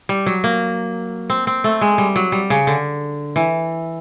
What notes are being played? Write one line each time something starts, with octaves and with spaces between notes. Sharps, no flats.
G3
F#3
A#3
C4
C4
A3
G#3
G3
F#3
G3
C#3
D3
E3